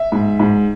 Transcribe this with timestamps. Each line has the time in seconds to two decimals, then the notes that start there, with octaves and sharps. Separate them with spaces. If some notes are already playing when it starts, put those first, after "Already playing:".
Already playing: E5
0.12 G#2
0.40 G#2